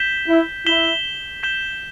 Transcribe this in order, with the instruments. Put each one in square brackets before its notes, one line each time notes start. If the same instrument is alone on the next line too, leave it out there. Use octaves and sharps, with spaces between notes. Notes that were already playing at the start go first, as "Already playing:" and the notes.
Already playing: [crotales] G6 B6 E7 G7
[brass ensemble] E4
[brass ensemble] E4 [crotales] G6 B6 E7 G7
[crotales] G6 B6 E7 G7